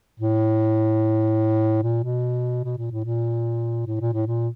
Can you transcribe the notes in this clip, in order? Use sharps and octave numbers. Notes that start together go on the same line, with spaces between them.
A2
A#2
B2
B2
A#2
A2
A#2
A2
A#2
A2
A#2